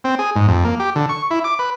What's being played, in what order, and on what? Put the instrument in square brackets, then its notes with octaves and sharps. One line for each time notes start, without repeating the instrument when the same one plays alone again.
[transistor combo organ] C4
G#4
G#2
F2
A#3
G4
D3
C#6
E4
D6
B4